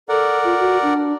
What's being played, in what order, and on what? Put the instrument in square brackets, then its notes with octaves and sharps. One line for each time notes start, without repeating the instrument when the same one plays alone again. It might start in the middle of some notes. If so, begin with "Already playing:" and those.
[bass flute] A4 [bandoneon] A#4 D5 F#5
[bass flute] F4
F#4
D4